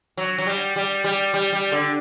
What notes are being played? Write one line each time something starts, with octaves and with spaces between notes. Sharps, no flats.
F#3
F#3
G3
G3
G3
G3
G3
D3